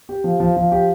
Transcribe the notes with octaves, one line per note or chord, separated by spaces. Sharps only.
G4
F3
F3
F3
G4